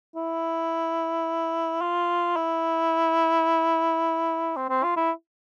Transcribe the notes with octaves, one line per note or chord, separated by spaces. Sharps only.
E4
F4
E4
C4
C4
F4
E4